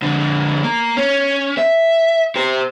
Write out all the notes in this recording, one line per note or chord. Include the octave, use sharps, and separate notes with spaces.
F2 D3
A#3
C#4
E5
G4 C5